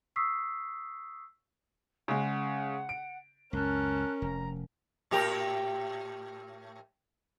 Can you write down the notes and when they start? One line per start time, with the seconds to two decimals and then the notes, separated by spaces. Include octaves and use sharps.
0.16 C#6 D#6 E6 B6 C7
2.08 C#3 G#3 F#5
2.89 D7
3.53 C#2 F#2 C#4 A#4 A5 F#6
4.22 F1 A#5
5.11 A2 G4 A#4